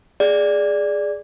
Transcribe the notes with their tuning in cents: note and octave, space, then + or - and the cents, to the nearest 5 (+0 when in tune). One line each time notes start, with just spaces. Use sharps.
G#4 +0 D5 +0